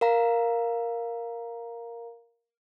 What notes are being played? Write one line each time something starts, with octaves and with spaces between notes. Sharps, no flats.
A#4 F5 A#5